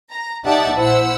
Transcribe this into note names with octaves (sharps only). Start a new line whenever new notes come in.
A#5
D#4 G4 D5 E5 F#5 A5
A#1 E4 C5 F#5 E6